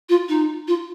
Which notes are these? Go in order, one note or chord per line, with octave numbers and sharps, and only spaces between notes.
F4
D#4
F4